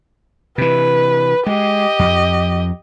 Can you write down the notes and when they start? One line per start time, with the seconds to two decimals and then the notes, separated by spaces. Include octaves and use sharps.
0.58 C3 E3 B4
1.46 G#3 G4 D#5
1.99 F2